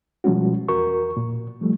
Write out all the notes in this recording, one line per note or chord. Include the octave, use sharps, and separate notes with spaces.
B2 F3 G3 G#3 C#4 F#4
E2 F#4 A#4 C#6
A#2
F3 G3 A3